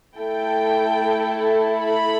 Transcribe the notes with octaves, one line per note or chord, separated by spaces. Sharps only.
A3 E4 A4 G5
B5